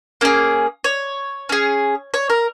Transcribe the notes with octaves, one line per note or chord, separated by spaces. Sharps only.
A#3 C#4 G#4
C#5
C#4 G#4
C#5
A#4